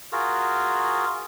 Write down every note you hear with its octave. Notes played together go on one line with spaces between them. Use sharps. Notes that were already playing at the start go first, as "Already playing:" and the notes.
F4 F#4 G#4 A#4